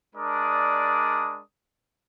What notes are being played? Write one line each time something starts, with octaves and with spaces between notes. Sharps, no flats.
G#3 D4 A#4 D5 D#6